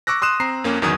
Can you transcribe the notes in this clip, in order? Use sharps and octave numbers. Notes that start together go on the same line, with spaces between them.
C#6 D6 E6 F#6 A#6
C6 D#6 F#6 E7
C4 A#5 C7
F2 A#3 C#4
G1 E2 D#3 F#3 D#6 G#6